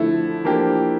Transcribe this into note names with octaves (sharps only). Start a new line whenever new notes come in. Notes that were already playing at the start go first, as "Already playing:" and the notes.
Already playing: D3 F3 A3 E4
F3 A#3 D4 G4